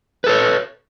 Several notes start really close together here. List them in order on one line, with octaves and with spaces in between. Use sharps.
B4 A4 C#5